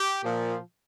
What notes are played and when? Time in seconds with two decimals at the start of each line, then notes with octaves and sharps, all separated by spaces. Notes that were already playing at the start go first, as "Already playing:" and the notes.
Already playing: G4
0.24 A#2 F3